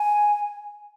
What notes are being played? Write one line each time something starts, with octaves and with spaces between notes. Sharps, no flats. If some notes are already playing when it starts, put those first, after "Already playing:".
Already playing: G#5